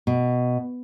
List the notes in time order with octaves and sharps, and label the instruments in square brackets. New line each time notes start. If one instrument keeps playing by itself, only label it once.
[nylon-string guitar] B2